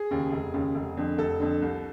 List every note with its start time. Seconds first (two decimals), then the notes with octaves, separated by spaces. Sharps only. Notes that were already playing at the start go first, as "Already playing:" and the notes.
Already playing: G#4
0.11 D#2 C#3
0.32 F1
0.54 D#2 C#3
0.75 F1
0.97 F2 D3
1.18 F1 A4
1.40 F2 D3
1.62 C2